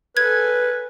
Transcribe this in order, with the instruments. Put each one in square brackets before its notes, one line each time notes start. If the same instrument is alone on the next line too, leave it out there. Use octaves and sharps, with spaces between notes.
[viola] A4 G#5 [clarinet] B4 [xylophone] G#6